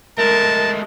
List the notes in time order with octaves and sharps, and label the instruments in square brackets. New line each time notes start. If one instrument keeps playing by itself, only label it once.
[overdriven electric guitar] G#3 A3 [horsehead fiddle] A#4 [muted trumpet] A5